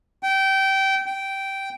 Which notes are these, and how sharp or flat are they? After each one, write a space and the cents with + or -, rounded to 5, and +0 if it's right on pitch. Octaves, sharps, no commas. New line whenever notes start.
G5 -20
G5 -10